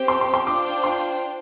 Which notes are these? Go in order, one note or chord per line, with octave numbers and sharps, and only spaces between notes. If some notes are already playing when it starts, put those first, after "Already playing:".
Already playing: C4 G4 C5 G5
C6
C6
C6
D4 F4 C5 G5 D6
C6